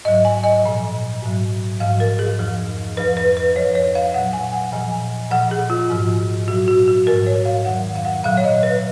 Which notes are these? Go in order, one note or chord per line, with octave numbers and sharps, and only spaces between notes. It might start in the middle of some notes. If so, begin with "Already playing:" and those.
G#2 F#3 D#5
G#5
D#5
A#2 F3
G#2 F#3
G#2 F3 F5
A#4
G#4
F2 F3
F2 F3 B4
B4
B4
F2 F3 C#5
C#5
F5
A#2 F#3 F#5
G#5
F#5
A#2 F3 G#5
A#2 F3 F#5
G#4
F4
G#2 F3
A#2 F#3 F#4
F#4
F#4
G#2 F3 A#4
C#5
F5
F2 D#3 F#3 F#5
F5
F#5
A#2 F#3 F5
C#5
D#5
B4